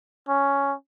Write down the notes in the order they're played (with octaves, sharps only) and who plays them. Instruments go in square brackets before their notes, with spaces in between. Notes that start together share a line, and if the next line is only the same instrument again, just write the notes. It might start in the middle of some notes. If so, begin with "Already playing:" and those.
[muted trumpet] C#4